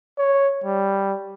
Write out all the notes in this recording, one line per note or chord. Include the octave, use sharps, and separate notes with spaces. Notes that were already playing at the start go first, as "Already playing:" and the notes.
C#5
G3